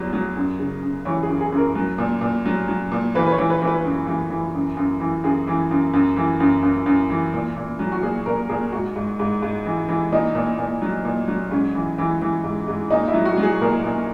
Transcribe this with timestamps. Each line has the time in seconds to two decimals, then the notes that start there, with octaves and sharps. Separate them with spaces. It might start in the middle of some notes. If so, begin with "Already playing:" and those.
Already playing: E2 F#3
0.13 F#3
0.36 F#2
0.59 C#3
0.82 F#2
1.05 E3 C#5
1.23 G#4
1.29 F#2
1.41 G#4
1.52 F#2
1.57 A#4
1.75 F#3
1.98 A#2
2.21 A#2
2.46 F#3
2.68 F#3
2.92 A#2
3.15 E3 B4
3.26 B4
3.32 C#5
3.38 E3
3.50 B4
3.62 E3
3.67 B4
3.84 F#2
4.07 E3
4.30 E3
4.55 F#2
4.77 F#2
5.00 E3
5.24 F#2 G#4
5.47 E3
5.71 F#2
5.93 F#2
6.17 E3
6.40 F#2
6.63 F#2
6.86 F#2
7.10 E3
7.34 A#2
7.56 A#2
7.79 F#3
7.92 F#4
8.02 A#2 G#4
8.26 A#2 A#4
8.49 A#2 G#4
8.72 G#2 F#4
8.96 G#2
9.19 G#2
9.42 G#2
9.66 E3
9.89 E3
10.12 A#2 D#4
10.35 A#2
10.59 A#2
10.82 F#3
11.05 A#2
11.28 F#3
11.51 G#2 C#4
11.75 E3
11.98 E3
12.22 E3
12.44 G#2
12.68 G#2
12.90 A#2 D#4
13.08 E4
13.14 F#3
13.25 F#4
13.38 F#3
13.43 G#4
13.61 A#2 A#4
13.84 A#2